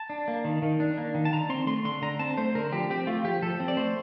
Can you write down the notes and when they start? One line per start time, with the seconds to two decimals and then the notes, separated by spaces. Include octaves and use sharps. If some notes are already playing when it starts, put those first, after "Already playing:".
Already playing: A5
0.10 D4
0.28 A#3
0.45 D#3
0.62 D#3
0.80 D4
0.98 A#3
1.15 D#3
1.25 A5
1.32 D3 A#5
1.49 C4 C6
1.67 A3 C6
1.85 D3 C6
2.02 D3 A#5
2.19 C4 A5
2.37 A3 C5
2.55 D3 A#4
2.72 F3 G4
2.90 C4 G4
3.07 A3 F4
3.25 F3 G4
3.42 F3 A4
3.60 C4
3.68 D5
3.77 A3 C5